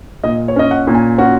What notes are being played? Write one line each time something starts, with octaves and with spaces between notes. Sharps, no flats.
A#2 D#5
C#5
C#4 D#5
F#5
A#2
G#5
C#4 F#4